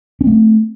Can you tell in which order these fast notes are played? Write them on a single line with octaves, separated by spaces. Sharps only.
C#4 C4 A3